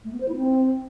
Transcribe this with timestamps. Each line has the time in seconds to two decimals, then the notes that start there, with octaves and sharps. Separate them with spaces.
0.04 A3
0.12 B3
0.20 C5
0.28 E4
0.36 C4